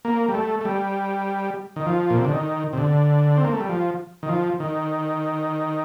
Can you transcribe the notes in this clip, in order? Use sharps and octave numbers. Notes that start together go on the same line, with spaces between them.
A#3
G3
A3
A3
G3
D#3
F3
A#2
C3
D3
D#3
C3
D3
C4
A#3
A3
G3
F3
D#3
F3
D#3